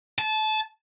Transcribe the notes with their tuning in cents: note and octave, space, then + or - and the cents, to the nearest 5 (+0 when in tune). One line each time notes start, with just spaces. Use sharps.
A5 -25